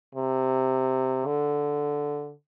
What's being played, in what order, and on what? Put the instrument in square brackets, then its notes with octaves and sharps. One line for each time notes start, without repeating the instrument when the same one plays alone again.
[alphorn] C3
D3